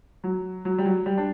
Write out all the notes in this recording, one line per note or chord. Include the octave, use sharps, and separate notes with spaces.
F#3
F#3
G3
F#3
G3
D4